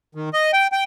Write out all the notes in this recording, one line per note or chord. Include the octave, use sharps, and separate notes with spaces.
D#3
D#5
G5
G5